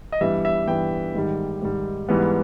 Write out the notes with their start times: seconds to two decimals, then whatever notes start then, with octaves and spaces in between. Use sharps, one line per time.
0.12 D#5
0.21 G2 E3 G3 B3 E5
0.45 E5
0.68 G2 E3 G3 B3 G5
1.14 G#2 D#3 G3
1.62 G#2 D#3 G3
2.09 G#2 E3 G3 B3